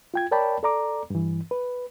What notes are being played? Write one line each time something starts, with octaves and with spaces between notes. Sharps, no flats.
F4 G5 G#6
A#4 C#5 D5 G5 A5 B5
A4 D5 A#5 D6
G2 E3
B4